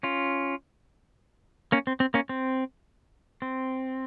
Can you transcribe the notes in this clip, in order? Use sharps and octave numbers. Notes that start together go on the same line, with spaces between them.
C#4 F4
A#3 C#4
C4
C4
A#3 C#4
C4
C4